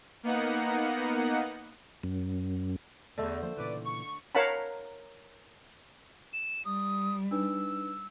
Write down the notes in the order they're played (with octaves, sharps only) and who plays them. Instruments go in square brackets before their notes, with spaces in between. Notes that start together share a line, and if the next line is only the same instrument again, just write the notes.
[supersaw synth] A#3 B3 D#4 F#5
[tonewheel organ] F#2
[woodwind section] E2 [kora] D3 A3
[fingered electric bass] F3 A#3 [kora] C5
[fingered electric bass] A#2 C#3 E3 [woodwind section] B4 D5
[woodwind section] C#6
[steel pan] A#4 C#5 F5 F#5 A5 B5
[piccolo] E7
[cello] G3 [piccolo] D#6
[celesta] D4 D#4 B4 [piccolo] E6